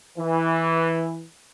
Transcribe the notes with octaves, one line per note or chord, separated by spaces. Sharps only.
E3